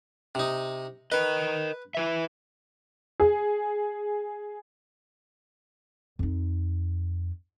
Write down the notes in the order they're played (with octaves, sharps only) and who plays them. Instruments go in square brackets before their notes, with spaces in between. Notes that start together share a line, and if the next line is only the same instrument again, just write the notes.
[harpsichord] C3 D#4
[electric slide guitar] A#4 D#5 [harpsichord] B4
[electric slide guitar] E4 B4 E5
[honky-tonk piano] G#4
[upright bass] F2 D#4